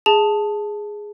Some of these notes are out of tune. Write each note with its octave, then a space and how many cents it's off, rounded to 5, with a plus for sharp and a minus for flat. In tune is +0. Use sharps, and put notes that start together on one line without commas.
G#4 +0 A5 +0